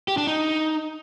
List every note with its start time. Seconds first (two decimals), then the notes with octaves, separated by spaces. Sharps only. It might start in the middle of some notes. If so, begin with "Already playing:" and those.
0.08 G4
0.18 D4
0.27 D#4